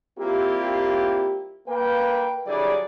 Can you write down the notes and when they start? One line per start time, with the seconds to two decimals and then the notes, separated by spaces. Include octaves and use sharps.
0.19 G3 A#3 C4 E4 F4 G4
1.68 A#3 B4 G5
2.47 D3 F#3 G3 E4 G#4 D5